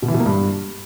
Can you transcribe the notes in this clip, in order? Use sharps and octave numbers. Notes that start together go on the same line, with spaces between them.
B2
E3
B2
A#3
G2